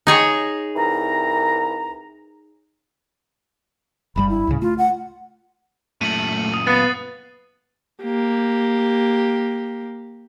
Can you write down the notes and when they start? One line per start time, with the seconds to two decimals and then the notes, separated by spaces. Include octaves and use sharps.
0.07 D#4 G#4 C#5
0.76 C2 E3 A#5
4.16 F#1 G2 G3 B5
4.29 E4
4.47 C#2 A2 C#3
4.62 A3 F4
4.78 F#5
6.01 F#2 A#2 A3 D#7 F#7
6.54 D#6
6.67 B3 F5 F#6 A6 C7
8.03 A#3 G4